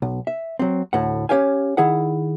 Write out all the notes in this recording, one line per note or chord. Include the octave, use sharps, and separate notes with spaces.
B1
E5
F#3 C4
D2 A2 F#5
C#4 D4 G4 C#5 F5 G#5
D#3 E4 G#4 F#5